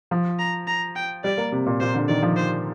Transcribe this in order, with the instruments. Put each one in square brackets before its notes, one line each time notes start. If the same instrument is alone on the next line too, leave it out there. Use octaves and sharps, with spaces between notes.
[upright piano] F3
[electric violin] A#5
A#5
G5
[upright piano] G3 [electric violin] D5
[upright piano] A#3
C3
A#2
[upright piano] A#2 [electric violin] C5
[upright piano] D3
[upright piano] D#3 [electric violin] D5
[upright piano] F3
[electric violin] C5